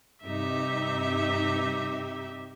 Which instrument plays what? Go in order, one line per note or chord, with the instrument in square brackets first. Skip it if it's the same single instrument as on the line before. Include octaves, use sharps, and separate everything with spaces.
[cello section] G2 C3 D#4 [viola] G4 E5